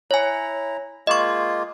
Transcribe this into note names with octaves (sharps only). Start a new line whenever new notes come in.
E4 C#5 G#5 A#5
G#3 A#3 F4 D#5 C#6